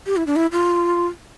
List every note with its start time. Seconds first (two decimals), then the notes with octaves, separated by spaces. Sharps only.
0.06 G4
0.17 E4
0.27 D4
0.36 E4
0.52 F4